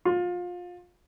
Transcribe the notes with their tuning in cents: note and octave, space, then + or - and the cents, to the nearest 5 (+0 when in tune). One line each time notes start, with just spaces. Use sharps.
F4 +25